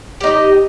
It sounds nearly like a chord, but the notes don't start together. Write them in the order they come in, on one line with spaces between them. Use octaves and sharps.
G4 D#4 D#5